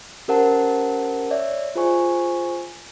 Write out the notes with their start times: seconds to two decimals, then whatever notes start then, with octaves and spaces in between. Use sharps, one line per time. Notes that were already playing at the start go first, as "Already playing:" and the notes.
0.28 C#4 G4 A#4 C5 F#5 A5
1.31 C#5 D5 E5
1.75 F4 G#4 C5 G#5 C#6